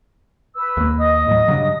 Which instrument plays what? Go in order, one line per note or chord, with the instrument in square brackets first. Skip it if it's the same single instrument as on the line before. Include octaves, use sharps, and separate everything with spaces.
[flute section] B4 E6
[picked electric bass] D#2 A#3
[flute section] D#5 D#6
[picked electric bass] A2 F#3
G2 C#3 F#3